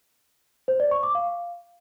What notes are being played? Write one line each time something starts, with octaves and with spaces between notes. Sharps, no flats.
C5
D5
C#6
D6
F5